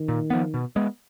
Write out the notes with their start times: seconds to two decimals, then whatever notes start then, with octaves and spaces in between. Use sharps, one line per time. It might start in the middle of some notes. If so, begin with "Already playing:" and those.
Already playing: D#3
0.08 A#2
0.30 F3 B3
0.54 B2
0.76 G#3 B3